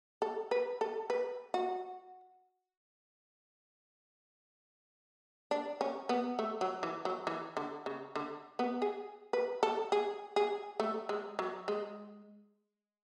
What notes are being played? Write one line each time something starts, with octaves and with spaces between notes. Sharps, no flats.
A4
B4
A4
B4
F#4
D4
C#4
B3
A3
F#3
E3
F#3
E3
D3
C#3
D3
B3
G#4
B4
A4
G#4
G#4
A3
G#3
F#3
G#3